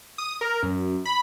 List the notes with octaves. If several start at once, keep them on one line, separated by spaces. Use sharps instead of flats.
D#6
A#4
F#2
B5